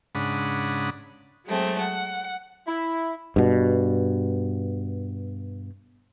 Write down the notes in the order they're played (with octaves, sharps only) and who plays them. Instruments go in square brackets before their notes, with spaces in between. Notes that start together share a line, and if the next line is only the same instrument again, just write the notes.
[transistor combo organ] G#2 C#3 D4 F#5 B5 D#6
[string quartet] F#3 G#3 A3 C4
F#5
[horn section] E4
[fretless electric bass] G2 B2